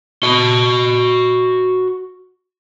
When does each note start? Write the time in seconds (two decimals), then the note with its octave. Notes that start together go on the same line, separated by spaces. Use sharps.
0.23 F#4 D#5